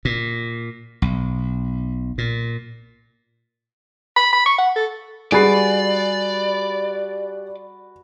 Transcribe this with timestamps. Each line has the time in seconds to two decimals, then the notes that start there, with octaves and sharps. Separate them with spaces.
0.05 A#2
1.02 B1
2.18 A#2
4.17 B5
4.33 B5
4.46 C#6
4.58 F#5
4.76 A4
5.32 G3 F#4 G#4 B4 D5 G#5 A6 C7